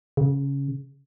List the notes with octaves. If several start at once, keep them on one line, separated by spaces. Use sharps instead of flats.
C#3